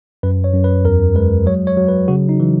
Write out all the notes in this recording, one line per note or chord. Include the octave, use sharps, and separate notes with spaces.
F#2 B4
C#5
F#2
B4
E2 A#4
G#3 B4
F#3 C#5
C#5
F#3
B4
C#3 F#4
D#4
E3